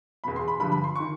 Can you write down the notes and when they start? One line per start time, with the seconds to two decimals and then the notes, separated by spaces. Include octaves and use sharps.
0.24 E2 B2 B5
0.36 C6
0.48 B5
0.60 G2 D3 F3 B5
0.72 B5
0.84 C6
0.95 D#3 C#6